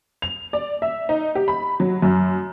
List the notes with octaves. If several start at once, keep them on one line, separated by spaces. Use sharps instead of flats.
F7
D5
E5
D#4
G4
B5
F#3
F#2